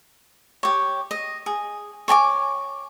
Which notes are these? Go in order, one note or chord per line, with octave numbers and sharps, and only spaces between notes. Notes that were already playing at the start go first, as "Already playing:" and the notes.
G4 C#5
D#5
G#4
C#5 G#5 A5 D6